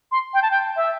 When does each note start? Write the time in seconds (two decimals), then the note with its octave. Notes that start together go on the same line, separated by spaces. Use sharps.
0.12 C6
0.34 G5
0.42 A5
0.51 G5
0.76 E5